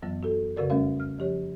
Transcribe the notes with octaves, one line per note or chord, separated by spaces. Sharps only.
F#2 E3 F#3 B3
F#4 A4
F2 C#3 F#4 A#4 D5
G3 A3 C#4 A#4 E5 F5
F6
F3 G4 C#5